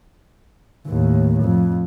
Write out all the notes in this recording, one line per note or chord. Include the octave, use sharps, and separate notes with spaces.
D#2 A2
F2